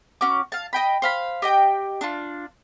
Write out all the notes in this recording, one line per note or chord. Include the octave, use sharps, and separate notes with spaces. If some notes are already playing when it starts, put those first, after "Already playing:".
C#4 F#4 D6
F5 A5
D#5 G5 B5
C5 F5 B5
G4 D#5 G5
D4 F4